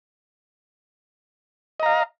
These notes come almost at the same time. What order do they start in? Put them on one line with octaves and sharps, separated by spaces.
D#5 A#5 F5